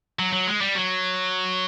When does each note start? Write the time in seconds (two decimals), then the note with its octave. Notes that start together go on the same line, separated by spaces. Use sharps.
0.19 F#3
0.33 F#3
0.47 G#3
0.61 G3
0.75 F#3